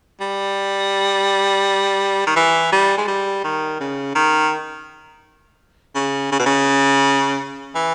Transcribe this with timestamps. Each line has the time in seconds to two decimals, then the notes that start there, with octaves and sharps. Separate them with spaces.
0.20 G3
2.27 D#3
2.36 E3
2.72 G3
2.98 G#3
3.08 G3
3.44 D#3
3.80 C#3
4.15 D#3
5.95 C#3
6.32 C#3
6.39 B2
6.46 C#3
7.75 E3